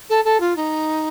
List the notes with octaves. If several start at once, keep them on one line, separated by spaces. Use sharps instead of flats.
A4
A4
F4
D#4